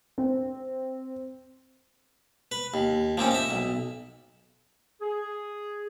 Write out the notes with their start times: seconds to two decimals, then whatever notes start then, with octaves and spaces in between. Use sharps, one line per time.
0.18 C4
2.52 B4
2.74 D#2
3.18 F3 A#3 C4 C#4
3.31 D#5 E5
3.51 B1
5.01 G#4